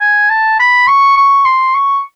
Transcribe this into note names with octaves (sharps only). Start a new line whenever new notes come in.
G#5
A5
B5
C#6
C#6
C6
C#6